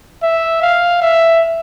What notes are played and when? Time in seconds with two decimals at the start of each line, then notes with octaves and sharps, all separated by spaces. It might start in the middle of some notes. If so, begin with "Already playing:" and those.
0.23 E5
0.62 F5
1.02 E5